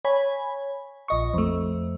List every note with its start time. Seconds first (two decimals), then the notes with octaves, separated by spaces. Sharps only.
0.05 C#5 G#5 B5
1.08 A#1 D#5 C#6
1.34 F2 A3